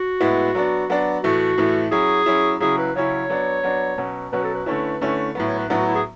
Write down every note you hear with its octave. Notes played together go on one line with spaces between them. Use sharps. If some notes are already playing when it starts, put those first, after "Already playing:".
Already playing: F#4
A2 G#3 B3 E4
F#3 B3 D4
F#3 B3 D4
A2 E3 A3 F#4
A2 E3 A3
F#3 C#4 E4 G#4
F#3 C#4 E4
C#3 F#3 C#4 E4 G#4
B4
C#3 F#3 C#4 E4 C#5
F#3 B3 D4
F#3 B3 D4
B2 F#3 C#4
B2 F#3 C#4 B4
A4
B4
D3 A3 C#4 E4 B4
D3 A3 C#4 E4
A2 F#3 B3
C#5
B4
A2 F#3 B3 D4
F#4
E4
G#4